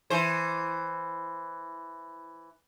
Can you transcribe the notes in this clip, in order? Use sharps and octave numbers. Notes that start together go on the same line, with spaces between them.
E3 C5